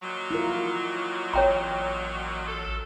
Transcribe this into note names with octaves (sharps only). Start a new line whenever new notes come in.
A#2 D#3 F#3
E4 F4 A#4
A1 C#5 G5 A#5
F3 F#3 A4